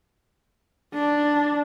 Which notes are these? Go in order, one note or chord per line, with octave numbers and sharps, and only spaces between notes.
D4